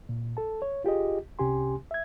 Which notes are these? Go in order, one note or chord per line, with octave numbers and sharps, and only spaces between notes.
A#2
A4 A5
C#5
F4 G4 G#4 D#5
C2 C3 C#4 G4 G#5 C6
E5 G#6